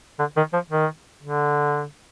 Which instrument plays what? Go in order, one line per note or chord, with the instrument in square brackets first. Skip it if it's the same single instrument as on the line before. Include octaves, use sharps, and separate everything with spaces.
[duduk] D3
D#3
F3
D#3
D3